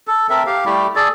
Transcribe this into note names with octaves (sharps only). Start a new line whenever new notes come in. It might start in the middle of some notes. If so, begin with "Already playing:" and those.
A4
C4 A4 A#4 E5
G4 F5
G3 A3 E4 G4
G#4 A4 D5